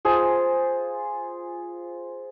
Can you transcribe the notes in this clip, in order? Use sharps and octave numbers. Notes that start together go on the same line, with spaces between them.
F4 G#4 C5 G#5